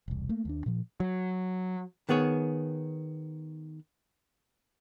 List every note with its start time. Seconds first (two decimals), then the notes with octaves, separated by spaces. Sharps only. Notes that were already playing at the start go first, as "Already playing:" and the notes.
0.08 E1 C2
0.29 A3 A#3
0.45 D#2 A3 D4
0.66 A#2 F3
1.00 F#3
2.09 D#3 B3 G#4 C#5